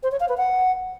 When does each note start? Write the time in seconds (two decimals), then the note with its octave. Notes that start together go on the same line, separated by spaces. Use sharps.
0.03 C5
0.12 C#5
0.20 F5
0.29 B4
0.37 F#5